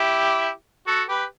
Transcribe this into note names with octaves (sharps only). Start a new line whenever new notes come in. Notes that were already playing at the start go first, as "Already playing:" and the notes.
Already playing: E4 G4
F#4 A4
G4 B4